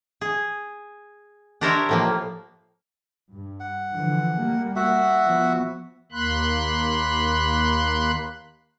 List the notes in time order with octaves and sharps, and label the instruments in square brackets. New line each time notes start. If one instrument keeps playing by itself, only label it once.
[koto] G#4
D4 G4 A#4 C5 C#5 E5
A2 F3 A#3
[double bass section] G2
[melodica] F#5
[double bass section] D3 E3 F3
G3 A3 A#3
[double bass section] A#3 [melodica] F#4 E5 F#5
[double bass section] F3 B3
[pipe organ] D#2 A#3 B5 C6 F#6